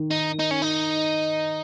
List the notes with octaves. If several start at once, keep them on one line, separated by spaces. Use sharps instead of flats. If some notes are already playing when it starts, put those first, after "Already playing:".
Already playing: D#3
D#4
D#4
C#4
D#4